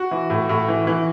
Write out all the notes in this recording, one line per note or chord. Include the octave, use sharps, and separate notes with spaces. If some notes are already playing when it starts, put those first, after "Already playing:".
Already playing: F#4
E3
A2
A2
E3
E3